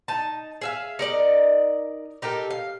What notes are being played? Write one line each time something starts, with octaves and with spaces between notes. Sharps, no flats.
D#4 A5
G#4 E5 F5
D#4 A#4 D5 D#5
D#4 G4 A4 A#4
F5